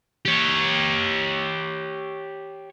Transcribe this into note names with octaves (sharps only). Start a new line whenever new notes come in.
G4 C#5